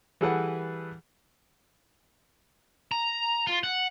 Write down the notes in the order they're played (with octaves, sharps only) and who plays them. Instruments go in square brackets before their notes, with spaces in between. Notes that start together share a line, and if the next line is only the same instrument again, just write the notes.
[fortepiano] E3 G3 G#4 A4 B4 F#5
[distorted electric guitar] A#5
F4
F#5